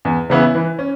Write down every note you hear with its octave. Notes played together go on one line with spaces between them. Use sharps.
E2
C#3 E3 B3 E4
E3
C#4